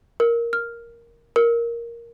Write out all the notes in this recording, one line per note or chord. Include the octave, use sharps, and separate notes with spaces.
A#4
F6
A#4